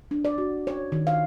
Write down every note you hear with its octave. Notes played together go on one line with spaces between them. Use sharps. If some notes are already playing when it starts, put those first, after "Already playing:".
D4
D5
F#4
C#5
D#3
F5